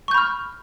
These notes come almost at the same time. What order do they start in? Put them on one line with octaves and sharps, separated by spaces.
C#6 G6 B5 F6